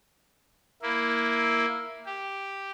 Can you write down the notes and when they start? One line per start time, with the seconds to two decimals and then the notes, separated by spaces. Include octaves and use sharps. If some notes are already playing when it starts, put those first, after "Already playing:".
0.82 A#3 E4
2.06 G4